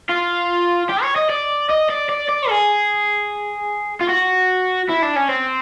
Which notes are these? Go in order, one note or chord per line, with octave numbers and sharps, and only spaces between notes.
F4
G4
C#5
D#5
D5
D#5
D5
D5
D5
G#4
F4
F#4
E4
D4
C#4
C4